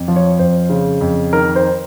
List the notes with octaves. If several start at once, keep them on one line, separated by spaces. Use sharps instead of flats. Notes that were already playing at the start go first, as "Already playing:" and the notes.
Already playing: F2
F3
C#5
F2 C5
C#3
F2
D#3 A#4
C5